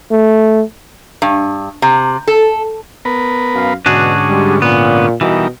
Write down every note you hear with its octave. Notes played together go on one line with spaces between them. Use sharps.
A3
G2
C3
A4
B3 A#4 B4
F#2 F5
G#2 B2 D3 C#4 D4 F#4 G#4
G3 G#3
A#2 B3
B2 E3 G3 D#4 A#4